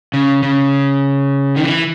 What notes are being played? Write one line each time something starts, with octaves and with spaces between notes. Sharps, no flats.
C#3
C#3
D#3
E3